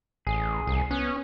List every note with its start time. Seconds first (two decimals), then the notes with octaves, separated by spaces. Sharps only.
0.27 A1 G#4
0.67 C2
0.91 B3 C#4